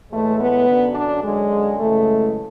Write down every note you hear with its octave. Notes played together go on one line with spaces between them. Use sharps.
A2 E3 G#3 A3
B3
F#2 D3 F#3
D4
F#2 D3 F#3 G#3
F#2 C#3 E3 G#3 A3